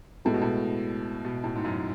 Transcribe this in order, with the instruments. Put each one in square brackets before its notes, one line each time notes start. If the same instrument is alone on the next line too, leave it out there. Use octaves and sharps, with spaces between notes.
[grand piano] A2 [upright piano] G#3 B3 F#4 A4
[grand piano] B2
A2
B2
A2
G#2
F#2